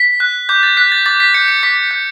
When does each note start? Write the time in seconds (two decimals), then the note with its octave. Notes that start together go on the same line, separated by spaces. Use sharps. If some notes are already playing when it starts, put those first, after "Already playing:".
Already playing: B6
0.20 F#6
0.49 D6 G6
0.63 A6
0.77 F#6 B6
0.92 A6
1.06 D6 A6
1.20 B6
1.34 G6 C#7
1.48 C#7
1.63 D6 B6
1.91 G6